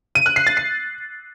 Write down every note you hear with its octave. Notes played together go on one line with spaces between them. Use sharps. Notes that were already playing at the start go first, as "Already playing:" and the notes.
D#7
F#6
C7
A6
C7